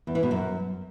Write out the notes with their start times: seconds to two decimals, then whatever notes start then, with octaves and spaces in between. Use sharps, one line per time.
0.07 E2
0.15 E3
0.23 B2
0.31 F#2